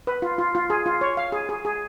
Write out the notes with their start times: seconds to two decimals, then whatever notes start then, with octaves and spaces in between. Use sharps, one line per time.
0.07 B4
0.22 F4
0.38 F4
0.55 F4
0.70 G#4
0.86 F4
1.01 C#5
1.17 F5
1.32 G#4
1.49 G#4
1.65 G#4